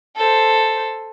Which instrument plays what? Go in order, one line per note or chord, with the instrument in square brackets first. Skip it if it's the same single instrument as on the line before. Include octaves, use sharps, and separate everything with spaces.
[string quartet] A4 C5